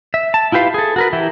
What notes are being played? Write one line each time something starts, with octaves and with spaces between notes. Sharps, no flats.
E5
A5
E4 F4 G4 B4 F5
G#4 A4
F#4 A#4 B4
E3 E4 G4